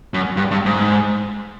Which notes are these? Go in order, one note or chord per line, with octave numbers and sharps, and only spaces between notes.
F#2
G2
G2
G#2